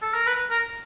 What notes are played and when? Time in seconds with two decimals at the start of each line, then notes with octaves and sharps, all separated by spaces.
0.02 A4
0.14 A#4
0.27 B4
0.51 A#4